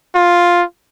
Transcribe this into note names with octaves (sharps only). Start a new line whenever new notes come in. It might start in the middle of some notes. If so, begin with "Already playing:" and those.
F4